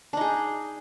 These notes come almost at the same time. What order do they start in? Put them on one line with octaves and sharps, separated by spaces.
D4 D#4 G#4